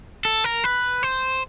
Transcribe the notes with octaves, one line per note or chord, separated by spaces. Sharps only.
A4
A#4
B4
C5